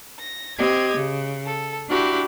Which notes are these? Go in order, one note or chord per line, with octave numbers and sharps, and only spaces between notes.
A#6
C4 G4 D#5 G#6
C#3
A4
D4 E4 F#4 G4 B5